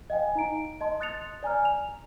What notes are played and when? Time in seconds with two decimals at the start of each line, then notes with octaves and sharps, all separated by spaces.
0.10 D#5 F5 G5 G#5
0.35 D#4 A#5 D7
0.81 D#5 A5 C6
1.00 D#6 F#6 A6 C#7 F7
1.43 D5 G#5 A#5 F6
1.65 F7